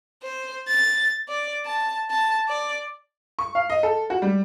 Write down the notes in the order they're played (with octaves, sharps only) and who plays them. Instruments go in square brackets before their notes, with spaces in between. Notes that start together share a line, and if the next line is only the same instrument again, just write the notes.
[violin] C5
A6
D5
A5
A5
D5
[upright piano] C#6
F5
D#5
A4
F#4
G3